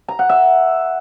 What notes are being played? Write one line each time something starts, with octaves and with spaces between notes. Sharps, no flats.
A#5
F#5
E5